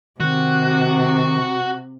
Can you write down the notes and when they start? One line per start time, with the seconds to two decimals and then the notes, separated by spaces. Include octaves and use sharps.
0.20 C3 D#3 F#4